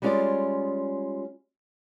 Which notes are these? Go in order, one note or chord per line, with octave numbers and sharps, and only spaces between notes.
G3 G#3 C#4 F4 G#4 D5